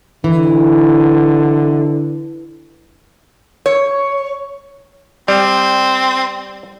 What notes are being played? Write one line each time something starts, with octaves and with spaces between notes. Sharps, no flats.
D3 E3
C#5
G3 C4